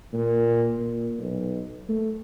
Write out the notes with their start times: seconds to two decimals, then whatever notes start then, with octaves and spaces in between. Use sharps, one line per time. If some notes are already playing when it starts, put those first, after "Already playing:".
0.13 A#2
0.79 A#2
1.19 B1
1.89 A3